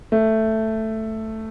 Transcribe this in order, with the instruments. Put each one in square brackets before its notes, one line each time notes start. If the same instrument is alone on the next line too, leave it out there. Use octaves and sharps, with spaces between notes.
[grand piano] A3